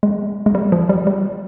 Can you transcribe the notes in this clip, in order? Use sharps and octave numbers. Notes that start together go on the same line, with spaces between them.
G#3
G#3
G3
F3
G3
G3